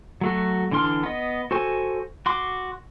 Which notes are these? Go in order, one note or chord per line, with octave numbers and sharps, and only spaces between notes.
F#3 A3 F#4
D3 E3 D4 C6 F6
B3 D#5
F#4 A4 C5 G#5 C#6
F#4 C6 D6